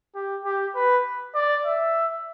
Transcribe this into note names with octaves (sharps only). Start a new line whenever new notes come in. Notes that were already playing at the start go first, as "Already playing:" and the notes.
G4
G4
B4
D5
E5